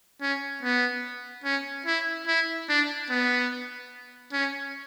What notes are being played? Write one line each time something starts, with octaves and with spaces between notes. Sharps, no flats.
C#4
B3
C#4
E4
E4
D4
B3
C#4